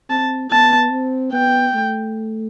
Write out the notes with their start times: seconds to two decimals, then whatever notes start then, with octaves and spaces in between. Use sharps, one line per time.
0.10 C4 A5
0.51 B3 A5
0.91 C4
1.33 B3 G5
1.74 A3